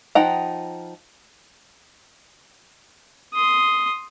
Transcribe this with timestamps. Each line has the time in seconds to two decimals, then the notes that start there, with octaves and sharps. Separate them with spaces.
0.15 F3 D#4 F#5 G5 A#5
3.33 C6 D#6